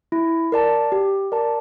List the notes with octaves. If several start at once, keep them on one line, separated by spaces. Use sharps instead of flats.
E4
A#4 D5 A5
G4
A#4 D5 A5